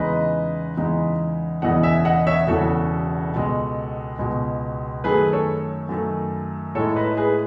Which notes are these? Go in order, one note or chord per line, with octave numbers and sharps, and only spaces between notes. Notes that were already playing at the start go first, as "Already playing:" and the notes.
Already playing: E2 C#3 G#3 D#4 B4 D#5
E2 C#3 G#3 D#4
E1 E2 C#3 D#5 F#5
E5 G#5
D#5 F#5
C#5 E5
E1 E2 C#3 F#4 A4
C#2 B2 G#3
C#2 B2 G#3
F#2 D#3 A3 G#4 B4
A4 C#5
F#2 D#3 A3
A2 G#3 D#4 A4 C#5
B4 D#5
G#4 B4